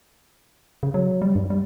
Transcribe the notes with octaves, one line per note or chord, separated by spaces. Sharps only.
C#3
F#3
G3
G2
G3